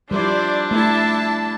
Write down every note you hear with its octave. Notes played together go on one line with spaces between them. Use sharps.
F3 G3 D4 E4 C5 D5
A3 E4 A5